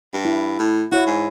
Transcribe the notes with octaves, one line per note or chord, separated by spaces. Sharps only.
G2
E4
A2
E4 F#4 C#5
G#2